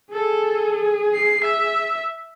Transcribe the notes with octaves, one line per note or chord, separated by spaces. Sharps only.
G#4 A4
C7
E5